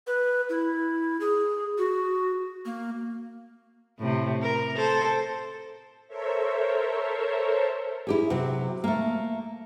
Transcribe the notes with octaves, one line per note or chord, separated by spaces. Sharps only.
B4
E4
G#4
F#4
A#3
A2 C3
A#4
A4 C5
A4 A#4 C5 C#5 E5
E4 G4 G#4
C3 F#3
A3 A#3